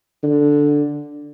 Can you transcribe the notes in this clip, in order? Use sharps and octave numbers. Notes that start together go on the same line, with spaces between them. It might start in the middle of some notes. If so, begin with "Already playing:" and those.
D3